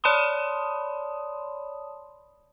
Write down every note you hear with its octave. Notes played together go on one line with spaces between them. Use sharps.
C#5 D5 A5 B5 C6 D#6